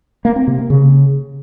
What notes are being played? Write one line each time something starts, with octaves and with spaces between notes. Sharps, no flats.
A#3
C4
C3
A#3
C#3